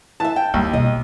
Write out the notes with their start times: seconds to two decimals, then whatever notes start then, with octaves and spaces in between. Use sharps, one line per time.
0.20 E3 E5 A5
0.36 G5
0.54 D#2 G3
0.73 B1 D#5